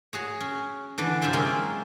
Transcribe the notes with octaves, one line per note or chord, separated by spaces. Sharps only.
F#4 G#4 C#5
C#4
D3 E3 D4
F#2 C3 F4 C5 E5 C6
G#3 A#3 C4 C#4